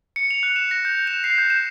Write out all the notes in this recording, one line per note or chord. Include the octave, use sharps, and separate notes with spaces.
C#7
F7
F#6
E7
A#6
G6
E7
C7
G6
E7